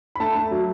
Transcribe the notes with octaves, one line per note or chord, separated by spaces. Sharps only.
B5
A3 A5
A3
F#3